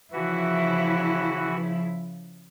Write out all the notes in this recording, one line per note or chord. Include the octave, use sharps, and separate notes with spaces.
C#3 E3 F3 E4 F#4